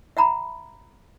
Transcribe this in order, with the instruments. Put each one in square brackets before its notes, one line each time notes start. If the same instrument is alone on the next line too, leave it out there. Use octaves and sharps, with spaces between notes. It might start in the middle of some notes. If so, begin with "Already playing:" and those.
[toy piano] E5 F#5 A#5 B5